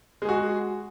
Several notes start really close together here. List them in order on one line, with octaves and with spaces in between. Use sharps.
G#3 G#4 F#4